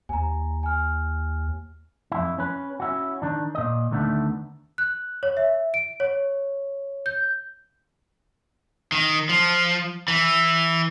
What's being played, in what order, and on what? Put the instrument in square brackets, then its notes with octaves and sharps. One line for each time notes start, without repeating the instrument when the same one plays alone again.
[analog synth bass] D#2 [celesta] G#5 A#5
[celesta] G#5 F6
[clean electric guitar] F2 E4
C#4 B4
C#4 E4 F#4
D#3 D4
A#2 D#5
D2 D3 D#3 A3 B3
[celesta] F#6
C#5
E5
D7
C#5
G6
[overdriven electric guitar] D#3
F3
E3